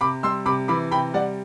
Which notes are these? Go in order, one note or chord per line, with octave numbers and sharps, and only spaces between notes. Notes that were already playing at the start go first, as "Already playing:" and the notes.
C3 B5 D6
G3 C6 E6
C3 B5 D6
E3 B5 D6
C3 G5 B5
G3 D5 F#5